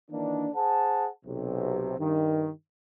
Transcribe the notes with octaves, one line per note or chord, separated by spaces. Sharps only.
D#3 E3 A#3 D4
G#4 C5 F#5 A5
B1 C3
G2 D#3